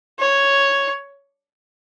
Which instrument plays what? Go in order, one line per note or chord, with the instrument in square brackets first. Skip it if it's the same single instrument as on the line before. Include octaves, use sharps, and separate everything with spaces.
[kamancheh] C#5